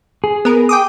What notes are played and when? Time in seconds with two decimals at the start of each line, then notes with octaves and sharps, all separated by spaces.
0.24 G#4
0.45 B3 A#4
0.69 G5 D6 D#6